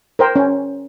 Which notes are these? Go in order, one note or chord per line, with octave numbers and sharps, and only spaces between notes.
A#4 C5 G5
C#4